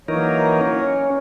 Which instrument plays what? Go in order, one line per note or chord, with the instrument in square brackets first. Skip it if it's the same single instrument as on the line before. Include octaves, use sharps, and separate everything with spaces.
[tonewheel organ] E3 D#4 A#4 [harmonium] F#3 A#3 C#5
[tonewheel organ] C#4